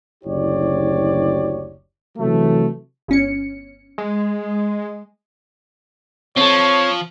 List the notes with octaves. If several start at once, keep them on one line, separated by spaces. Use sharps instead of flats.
F#1 D2 E4 G4 C#5 D5
C3 E3 F#3 A3
G1 C#4 C#7
G#3
F3 C4 A4 C#5